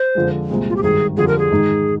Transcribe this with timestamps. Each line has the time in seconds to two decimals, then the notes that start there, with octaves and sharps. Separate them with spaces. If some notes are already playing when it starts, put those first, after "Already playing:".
Already playing: C5
0.15 F2 D3 F3 G#3
0.50 C2 A#2 G#3 C4
0.70 F4
0.76 G4
0.83 G#1 G2 D#3 G#4
1.17 F2 D3 G3 G#4
1.28 A#4
1.38 G#4
1.51 G#2 D#3 G#3 D#4